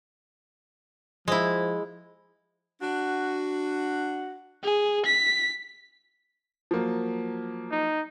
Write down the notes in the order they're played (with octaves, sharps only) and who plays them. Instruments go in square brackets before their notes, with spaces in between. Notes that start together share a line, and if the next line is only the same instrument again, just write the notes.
[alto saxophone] F3 [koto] G#3 E4
[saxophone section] D4 F#4
[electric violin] G#4
B6
[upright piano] F3 F#3 A#3
[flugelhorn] D#4